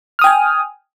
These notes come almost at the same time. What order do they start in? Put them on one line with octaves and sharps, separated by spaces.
F6 D#6 G5 G#5